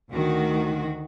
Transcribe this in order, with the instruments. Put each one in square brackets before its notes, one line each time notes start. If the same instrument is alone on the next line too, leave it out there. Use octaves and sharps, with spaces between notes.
[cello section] D2 D#3 F#4